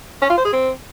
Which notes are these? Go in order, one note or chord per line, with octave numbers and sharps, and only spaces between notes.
C#4
F4
C5
G#4
C4